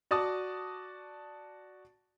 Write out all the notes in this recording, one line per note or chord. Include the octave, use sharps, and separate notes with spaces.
F#4 D5 A5 D#6